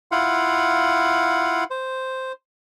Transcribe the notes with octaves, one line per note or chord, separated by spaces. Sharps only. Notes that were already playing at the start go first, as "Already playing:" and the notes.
E4 F4 F5 F#5
C5